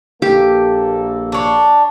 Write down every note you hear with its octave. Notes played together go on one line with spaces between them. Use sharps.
A#1 A#3 G4 A4
D4 C#5